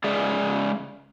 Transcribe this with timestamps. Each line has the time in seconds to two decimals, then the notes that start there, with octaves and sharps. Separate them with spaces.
0.04 C#3 G#3 G#4 D5 E5